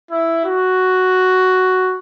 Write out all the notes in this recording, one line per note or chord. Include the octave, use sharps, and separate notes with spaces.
E4
F#4